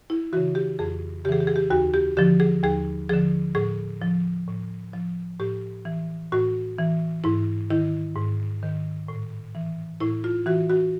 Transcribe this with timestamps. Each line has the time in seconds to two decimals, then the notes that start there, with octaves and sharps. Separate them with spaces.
0.10 E4
0.33 C#3 E3 F#4
0.55 G4
0.79 F2 G#4
1.25 C#3 G4
1.29 E3 G#4
1.40 G4
1.47 G#4
1.56 G4
1.70 D#2 F#4
1.94 G4
2.17 D3 F3 G4
2.40 G#4
2.63 D#2 G#4
3.09 D3 F3 G#4
3.55 A2 G#4
4.02 F3
4.48 A2
4.93 F3
5.40 A2 G4
5.85 E3
6.32 A2 F#4
6.78 E3
7.24 G#2 E4
7.70 D#3 E4
8.16 G#2
8.63 D#3
9.08 A2
9.55 E3
10.00 A2 E4
10.24 F4
10.46 E3 F#4
10.70 F#4